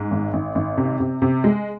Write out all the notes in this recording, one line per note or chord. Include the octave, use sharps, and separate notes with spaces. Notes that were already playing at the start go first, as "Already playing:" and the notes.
Already playing: G#2
G#1
G#1
G#1
C3
C3
C3
G#3